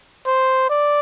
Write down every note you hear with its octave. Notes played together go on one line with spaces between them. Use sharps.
C5
D5